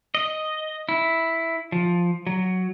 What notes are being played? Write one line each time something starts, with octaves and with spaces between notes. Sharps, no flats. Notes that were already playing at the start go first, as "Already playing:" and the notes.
D#5
E4
F3
F#3